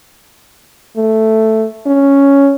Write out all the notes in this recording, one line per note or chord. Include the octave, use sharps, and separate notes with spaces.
A3
C#4